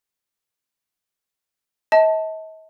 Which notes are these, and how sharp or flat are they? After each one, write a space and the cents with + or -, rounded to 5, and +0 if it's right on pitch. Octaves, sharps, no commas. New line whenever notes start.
D#5 +45 A5 +0